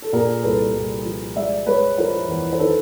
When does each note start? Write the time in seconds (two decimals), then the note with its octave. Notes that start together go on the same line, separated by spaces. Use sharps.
0.02 A4
0.13 A#2 G#4 A#4
0.43 C2 A4 B4
0.74 C2
1.05 F3
1.36 G#3 D5 E5
1.67 G#3 B4 C#5
1.98 F3 A#4 C5
2.28 E2
2.53 C5
2.59 D#3 A4 B4